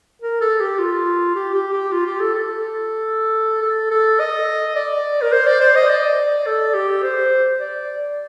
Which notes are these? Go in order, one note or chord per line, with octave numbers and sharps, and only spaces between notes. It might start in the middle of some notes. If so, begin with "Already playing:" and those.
A#4
A4
G4
F4
G4
G4
G4
F4
G4
A4
A4
A4
A4
D#5
D5
A#4
C5
D5
C5
D#5
D5
A4
G4
C5
D5